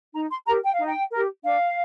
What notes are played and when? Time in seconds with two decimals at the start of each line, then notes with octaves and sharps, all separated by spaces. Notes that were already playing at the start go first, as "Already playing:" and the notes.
0.14 D#4 A#5
0.30 C6
0.46 G4 A#4 A#5
0.63 G5
0.74 F5
0.79 D#4
0.86 G5
1.11 G4 A#4
1.44 D4 F5